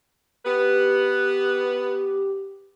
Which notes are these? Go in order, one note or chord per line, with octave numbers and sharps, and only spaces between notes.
B3 G4 B4